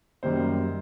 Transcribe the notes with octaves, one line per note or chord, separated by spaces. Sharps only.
F#2 D#3 G3 A#3 C5